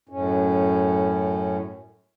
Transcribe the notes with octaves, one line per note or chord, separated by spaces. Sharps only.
F#2 A2 C#4